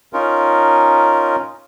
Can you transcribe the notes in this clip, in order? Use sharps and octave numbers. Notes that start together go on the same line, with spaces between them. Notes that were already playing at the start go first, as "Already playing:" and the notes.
C#4 D#4 F4 A#4